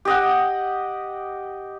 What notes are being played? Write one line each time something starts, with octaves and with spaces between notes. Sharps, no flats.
G4 D#5 F#5